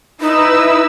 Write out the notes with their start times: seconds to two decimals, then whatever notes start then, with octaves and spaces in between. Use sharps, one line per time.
0.21 D#4 E4 B4 E6